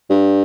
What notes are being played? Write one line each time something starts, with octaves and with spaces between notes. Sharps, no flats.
G2